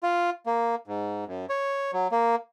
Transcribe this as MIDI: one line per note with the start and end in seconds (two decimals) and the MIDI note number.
0.03 0.30 65
0.46 0.75 58
0.87 1.24 44
1.27 1.46 42
1.50 1.91 73
1.93 2.07 54
2.12 2.35 58